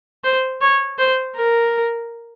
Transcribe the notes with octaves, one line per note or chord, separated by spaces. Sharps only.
C5
C#5
C5
A#4